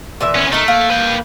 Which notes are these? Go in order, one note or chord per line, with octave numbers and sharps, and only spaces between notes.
A#2 E3 E5
B3 C#4
A3 D#4 A#4
A#3
B4 G5